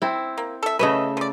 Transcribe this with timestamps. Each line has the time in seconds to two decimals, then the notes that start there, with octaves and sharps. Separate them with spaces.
0.02 C4 E4
0.38 A#3
0.63 A4 E5
0.79 C#3 A3 B4 C#5 D#5 E5
1.17 F3 D5